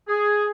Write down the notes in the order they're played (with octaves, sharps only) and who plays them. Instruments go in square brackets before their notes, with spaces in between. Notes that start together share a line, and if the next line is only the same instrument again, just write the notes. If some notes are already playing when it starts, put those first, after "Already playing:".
[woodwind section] G#4